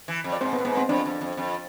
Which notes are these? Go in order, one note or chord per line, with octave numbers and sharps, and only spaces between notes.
E3
F2
D5
G#2 C4 C5
B3 B4
A2
G#2 B3 B4
C4 C5
F2 D4 D5
F2
F2
F2